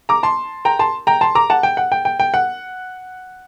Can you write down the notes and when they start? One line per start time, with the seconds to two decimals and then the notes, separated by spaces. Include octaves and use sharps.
0.09 A#5 D6
0.23 A5 C6
0.65 G5 A#5
0.79 A5 C6
1.07 G5 A#5
1.21 A5 C6
1.35 A#5 D6
1.50 F#5 A5
1.63 G5
1.77 F#5
1.92 G5
2.05 G5
2.20 G5
2.34 F#5